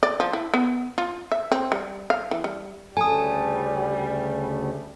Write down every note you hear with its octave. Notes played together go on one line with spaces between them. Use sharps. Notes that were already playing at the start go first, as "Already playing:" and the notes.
D5
F3
E4
B3
F4
E5
C4
G3
F5
E3
G3
D2 C#3 G3 A3 A4 G#5 D#6